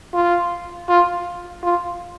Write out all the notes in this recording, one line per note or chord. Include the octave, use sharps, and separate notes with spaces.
F4
F4
F4